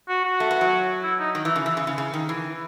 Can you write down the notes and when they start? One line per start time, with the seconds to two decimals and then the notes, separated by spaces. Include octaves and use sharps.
0.09 F#4
0.25 F#4
0.40 A3
0.51 B3
0.61 F#3
1.03 E4
1.20 D#4
1.35 D#3
1.45 E3
1.56 C#3
1.66 E3
1.77 C#3
1.87 C#3
1.98 C#3
2.14 D#3
2.29 E3